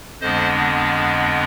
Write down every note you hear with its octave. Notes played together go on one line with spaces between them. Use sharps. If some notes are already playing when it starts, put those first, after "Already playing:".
F2 D3 G#3 B3 D4 C5 D#5